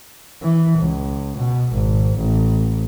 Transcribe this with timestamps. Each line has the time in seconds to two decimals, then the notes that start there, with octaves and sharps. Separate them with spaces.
0.42 E3
0.78 C#2
1.37 B2
1.72 G#1
2.18 A1